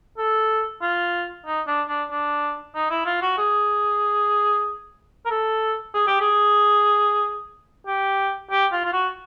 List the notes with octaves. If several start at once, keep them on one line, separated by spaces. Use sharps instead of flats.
A4
F4
D#4
D4
D4
D4
D#4
E4
F4
F#4
G#4
A#4
A4
G#4
G4
G#4
G4
G4
F4
F4
F#4